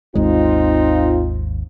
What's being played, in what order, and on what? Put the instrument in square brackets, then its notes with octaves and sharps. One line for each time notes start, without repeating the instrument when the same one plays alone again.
[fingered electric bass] G#1 D#2 G#3 [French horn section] C4 D#4 F4